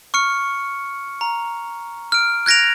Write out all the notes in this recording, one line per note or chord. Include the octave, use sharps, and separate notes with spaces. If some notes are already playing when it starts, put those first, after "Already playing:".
C#6 F6 C#7
A#5
F6 D7
F#6 G#6 A#6 D7 F7